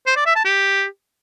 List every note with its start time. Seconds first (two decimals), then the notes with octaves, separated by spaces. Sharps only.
0.07 C5
0.16 D5
0.26 E5
0.35 A5
0.45 G4